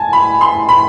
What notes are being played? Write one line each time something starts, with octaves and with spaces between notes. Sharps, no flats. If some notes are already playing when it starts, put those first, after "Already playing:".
Already playing: G#5 A5
B5
C6
B5